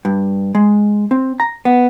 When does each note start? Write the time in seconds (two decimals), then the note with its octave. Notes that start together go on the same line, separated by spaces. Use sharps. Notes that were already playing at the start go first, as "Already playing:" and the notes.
0.05 G2
0.55 G#3
1.11 C4
1.40 A#5
1.65 B3